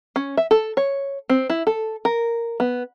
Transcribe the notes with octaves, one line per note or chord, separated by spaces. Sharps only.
C#4
E5
A4
C#5
C4
E4
A4
A#4
B3